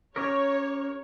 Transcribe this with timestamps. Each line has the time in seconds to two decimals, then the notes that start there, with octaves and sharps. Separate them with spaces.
0.16 C#4 G4 A#4 C#5